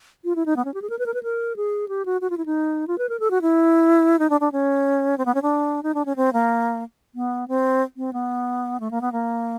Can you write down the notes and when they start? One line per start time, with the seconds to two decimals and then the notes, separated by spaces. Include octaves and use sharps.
0.24 F4
0.36 E4
0.46 D#4
0.56 B3
0.65 C#4
0.74 G4
0.82 G#4
0.90 A#4
0.99 B4
1.06 A#4
1.14 B4
1.23 A#4
1.56 G#4
1.88 G4
2.05 F#4
2.21 F#4
2.30 F4
2.37 E4
2.46 D#4
2.87 F4
2.98 B4
3.09 A#4
3.20 A4
3.31 F#4
3.42 E4
4.19 D#4
4.30 D4
4.40 D4
4.52 C#4
5.18 C4
5.25 B3
5.34 C#4
5.42 D4
5.83 D#4
5.94 D4
6.05 C#4
6.16 C4
6.33 A#3
7.15 B3
7.48 C4
7.97 C4
8.13 B3
8.80 A3
8.91 A#3
9.01 B3
9.12 A#3